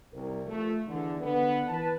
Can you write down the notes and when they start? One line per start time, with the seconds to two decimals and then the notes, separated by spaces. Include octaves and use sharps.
0.13 C2 A#4
0.46 F3 A3
0.87 E2 D3
1.20 D3 B3
1.68 E3 B4 A5